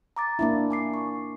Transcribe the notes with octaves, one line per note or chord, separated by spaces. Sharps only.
A#5 D6 A6
A#3 D4 E4
G#5 D6 C7
C#6